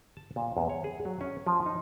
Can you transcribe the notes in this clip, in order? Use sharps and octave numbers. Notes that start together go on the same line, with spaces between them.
A5
A#2
E2
C#5
G#4
F#3
C#4
F3
D#4